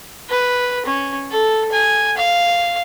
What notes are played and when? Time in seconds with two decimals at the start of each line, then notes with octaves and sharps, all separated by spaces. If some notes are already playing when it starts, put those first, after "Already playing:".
0.30 B4
0.85 C#4
1.31 A4
1.72 G#5
2.17 F5